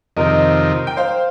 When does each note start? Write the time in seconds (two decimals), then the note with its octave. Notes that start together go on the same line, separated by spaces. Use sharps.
0.17 F2 C3 D#3 A#4 D#5
0.87 G5
0.97 C5 F5